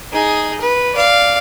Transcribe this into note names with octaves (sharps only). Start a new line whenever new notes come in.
D#4 G#4
B4
D5 F5